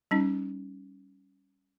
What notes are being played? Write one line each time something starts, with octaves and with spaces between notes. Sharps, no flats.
G3 C#4 D#4